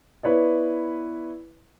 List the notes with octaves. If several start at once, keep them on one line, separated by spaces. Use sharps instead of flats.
B3 E4 B4 C#5 D5